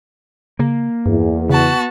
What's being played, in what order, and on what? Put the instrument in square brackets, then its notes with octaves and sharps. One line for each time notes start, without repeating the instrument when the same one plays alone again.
[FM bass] C#3 [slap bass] A#3
[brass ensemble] E2 [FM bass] G2
[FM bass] C#3 [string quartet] B3 F#4 A5